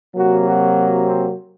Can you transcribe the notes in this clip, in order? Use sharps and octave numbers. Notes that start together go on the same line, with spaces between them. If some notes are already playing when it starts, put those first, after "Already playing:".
C3 F#3 A#3 F#4
F#4
C4